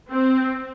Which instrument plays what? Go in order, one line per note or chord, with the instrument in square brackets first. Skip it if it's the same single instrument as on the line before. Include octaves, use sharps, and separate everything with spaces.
[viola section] C4